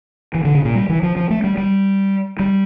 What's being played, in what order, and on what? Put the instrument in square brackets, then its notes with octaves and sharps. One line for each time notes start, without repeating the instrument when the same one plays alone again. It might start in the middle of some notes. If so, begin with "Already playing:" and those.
[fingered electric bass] E3
D3
C#3
A#2
G3
E3
F3
F3
A3
G3
G3
G3